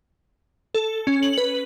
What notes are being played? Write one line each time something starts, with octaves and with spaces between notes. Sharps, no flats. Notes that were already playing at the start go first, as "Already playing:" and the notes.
A4
C#4
F#7
B4